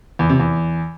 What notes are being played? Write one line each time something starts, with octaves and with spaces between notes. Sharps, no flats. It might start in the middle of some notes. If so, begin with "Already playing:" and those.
E2
C3
E2